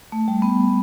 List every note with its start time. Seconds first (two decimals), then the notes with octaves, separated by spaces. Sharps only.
0.12 A3
0.28 G3
0.42 B3